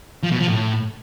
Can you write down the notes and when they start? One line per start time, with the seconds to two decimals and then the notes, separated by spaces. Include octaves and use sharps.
0.23 F3
0.32 B2
0.40 F3
0.48 A2